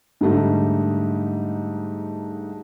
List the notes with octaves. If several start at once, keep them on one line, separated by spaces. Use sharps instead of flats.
G#2 D3 G3 A3 D#4